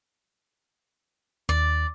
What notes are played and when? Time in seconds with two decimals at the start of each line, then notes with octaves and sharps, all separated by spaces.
1.49 D#2 D5